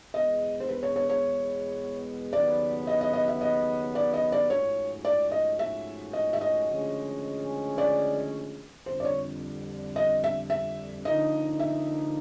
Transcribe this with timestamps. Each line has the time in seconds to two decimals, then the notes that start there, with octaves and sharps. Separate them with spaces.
0.14 E2 B2 G#3 B3 D#5
0.60 C5
0.69 B4
0.83 C#5
0.96 C#5
1.10 C#5
2.32 D#2 C#3 F#3 B3 D5
2.87 D#5
3.01 D#5
3.13 D#5
3.28 E5
3.41 D#5
3.95 D5
4.14 D#5
4.32 D5
4.50 G#2 F3 A3 C#4 F#4 C#5
5.05 D5
5.32 D#5
5.59 E5
6.13 D#5
6.33 E5
6.41 D#5
6.69 D2 C#3 F3 G#3 C#4
7.78 D5
8.86 F2 D3 G3 C5
9.00 D5
9.05 C#5
9.96 D#5
10.24 E5
10.50 E5
11.05 D3 F3 A#3 D#4 D#5
11.59 E5